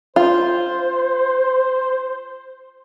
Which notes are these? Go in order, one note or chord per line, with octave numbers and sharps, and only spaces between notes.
F4 C5